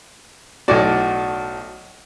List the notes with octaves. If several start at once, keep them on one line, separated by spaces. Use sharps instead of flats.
B1 A2 F#4 D5